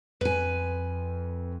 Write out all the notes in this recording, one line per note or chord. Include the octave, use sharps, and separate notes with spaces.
F2 B4 G#5